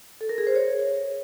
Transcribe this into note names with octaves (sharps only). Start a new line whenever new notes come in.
A4
A#4
G#4
C5
C#5